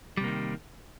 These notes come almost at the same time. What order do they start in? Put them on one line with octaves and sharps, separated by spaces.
G3 C3 A#3 D#3